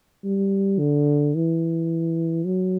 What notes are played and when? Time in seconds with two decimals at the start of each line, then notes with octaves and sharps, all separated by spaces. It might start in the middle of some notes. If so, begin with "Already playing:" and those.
0.24 G3
0.79 D3
1.35 E3
2.45 F#3